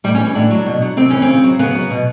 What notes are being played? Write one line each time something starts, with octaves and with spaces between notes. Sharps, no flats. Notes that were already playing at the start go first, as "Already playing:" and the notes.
A2 G3
C#4
E3
C#4
A2 D4
F#3
B2
F#3
C3 C4
E3 C#4
C4
C#3
F#3
C#3 B3
F#3
B2